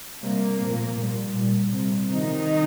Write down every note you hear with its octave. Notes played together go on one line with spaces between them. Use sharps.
C3 G3 A#3
A#2 F3
A#2 G3
A#2 G3
C3 G3
C3 D#3 F3 D#4